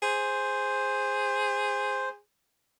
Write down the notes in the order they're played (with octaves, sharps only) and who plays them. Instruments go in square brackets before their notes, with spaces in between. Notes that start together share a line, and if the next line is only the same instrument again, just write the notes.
[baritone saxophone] G#4 [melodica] C5